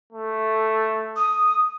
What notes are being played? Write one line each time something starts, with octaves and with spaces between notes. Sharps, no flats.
A3
D#6